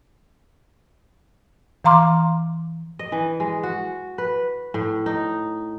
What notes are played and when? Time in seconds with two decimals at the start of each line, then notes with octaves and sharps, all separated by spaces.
1.84 E3 F5 A#5 C6 D6 F6
2.99 D#5
3.12 E3
3.40 G#3
3.63 F#4
4.18 B4
4.74 A2
5.06 D#4